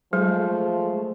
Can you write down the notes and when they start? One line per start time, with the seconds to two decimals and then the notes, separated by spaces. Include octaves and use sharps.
0.13 F3 F#3 G#3 A3 G#4 C5